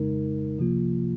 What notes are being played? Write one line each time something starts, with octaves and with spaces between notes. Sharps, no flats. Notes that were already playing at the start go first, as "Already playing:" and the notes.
Already playing: F2 C#3 G#3 D#4 A#4
C2 C3 F3 A#3 F4